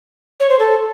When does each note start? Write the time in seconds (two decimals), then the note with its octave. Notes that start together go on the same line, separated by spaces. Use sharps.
0.40 C#5
0.50 C5
0.59 A4